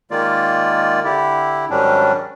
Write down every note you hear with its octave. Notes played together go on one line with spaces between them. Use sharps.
D#3 G#3 A#3 F4 D5
D3 E4 G4
G#2 D#3 F#3 G3 C#4 D4